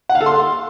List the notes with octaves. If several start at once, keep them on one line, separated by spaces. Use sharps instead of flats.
F#5
F5
A4
C6